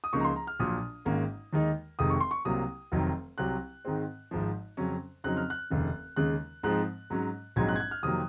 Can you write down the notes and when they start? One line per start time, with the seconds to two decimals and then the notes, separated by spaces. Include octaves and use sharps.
0.04 D#6
0.13 C#2 C#3 F3 A#3 D#4 C#6
0.20 A#5
0.24 C6
0.36 A#5
0.47 F6
0.60 A#1 A#2 F#3 D#6
1.05 G#1 G#2 D#3 A#3 C#4
1.53 D#2 D#3 G#3 D#4
1.99 F1 F2 C3 D#3 G#3 D#6
2.10 C#6
2.20 C6
2.31 C#6
2.45 C2 C3 F#3 A#3 D#6
2.92 F1 F2 D#3 F#3
3.38 C2 C3 F#3 C4 F#6
3.85 G#2 D#3 G#3 C4
4.31 G#1 G#2 F3
4.77 F2 C#3 F#3 C#4
5.24 F2 C#3 F#3 C4 D#4 F#6
5.37 F6
5.50 F#6
5.70 F1 D#2 C#3
6.16 D#2 C#3 G#3 F#6
6.63 G#2 F3 G#3 C4 D#4 F#6
7.10 G#2 F#3 C#4
7.56 A#1 G#2 F#3 C4 D#4 G#6
7.69 F#6
7.76 G#6
7.80 F#6
7.91 F6
8.03 F2 C3 D#3 F#3 A#3 D#6